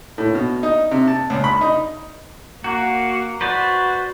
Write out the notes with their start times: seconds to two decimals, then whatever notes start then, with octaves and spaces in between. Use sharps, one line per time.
0.18 A2
0.35 B2
0.63 D#4
0.91 C3
1.08 A5
1.30 C#2
1.44 B5
1.61 D#4
2.64 A#3 F#4
3.41 F#4 B4 C5 D5